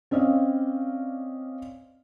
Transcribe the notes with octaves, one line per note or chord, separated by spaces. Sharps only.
C4 C#4 D5 D#5 F5